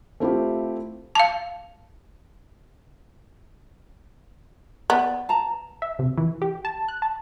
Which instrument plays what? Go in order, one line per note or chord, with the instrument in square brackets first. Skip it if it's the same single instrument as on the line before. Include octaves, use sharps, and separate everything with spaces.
[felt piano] A3 C4 E4 F4 G4
[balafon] F5 A5
[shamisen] B3 [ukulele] D5
[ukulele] A5 A#5
[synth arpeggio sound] E5
C3
E3
G4
A5
F#6
A5